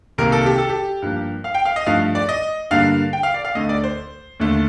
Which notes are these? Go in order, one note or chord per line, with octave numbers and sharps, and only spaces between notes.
C2 C3 D#3 A#3 A#4
A4
G4
A4
G4
G2 F3 A#3
F5
G5
F5
D#5
G2 F3 A3 F5
D5
D#5
G2 D3 G3 A#3 F5
G5
F5
D5
F5
D2 D3 A3 D#5
D5
C5
D#2 D3 A3